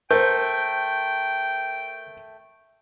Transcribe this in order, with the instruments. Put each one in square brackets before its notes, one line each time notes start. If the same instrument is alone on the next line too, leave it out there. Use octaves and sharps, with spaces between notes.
[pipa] A3 [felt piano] A#4 C5 [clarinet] G5 [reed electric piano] G6